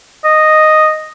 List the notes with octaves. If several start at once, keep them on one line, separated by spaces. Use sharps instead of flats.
D#5